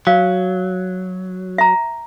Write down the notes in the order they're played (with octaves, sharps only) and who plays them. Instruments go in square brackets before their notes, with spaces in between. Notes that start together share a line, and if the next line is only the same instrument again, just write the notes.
[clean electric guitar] F#3 [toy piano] F5
[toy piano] E5 A#5